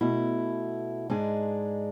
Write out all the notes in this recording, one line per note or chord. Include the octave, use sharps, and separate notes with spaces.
B2 A3 E4
G#2 G#3 D4 G#4